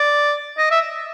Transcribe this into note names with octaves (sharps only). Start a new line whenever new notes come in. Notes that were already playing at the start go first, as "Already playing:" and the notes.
Already playing: D5
D#5
E5